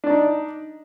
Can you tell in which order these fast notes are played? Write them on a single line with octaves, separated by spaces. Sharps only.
D4 D5 D#4